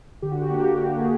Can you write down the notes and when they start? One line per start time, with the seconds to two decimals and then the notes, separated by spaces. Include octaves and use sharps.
0.22 D3 G4
0.31 F#4
0.42 G4
0.50 A#3
0.78 D3
0.99 G#4